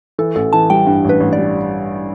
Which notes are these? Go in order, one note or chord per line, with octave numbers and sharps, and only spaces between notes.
E3 A4
A1 A4
E3 A5
G3 G5
G2
A1 B4
A1
D5
G3